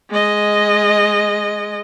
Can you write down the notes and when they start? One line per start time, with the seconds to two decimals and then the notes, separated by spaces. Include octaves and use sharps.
0.10 G#3 D#5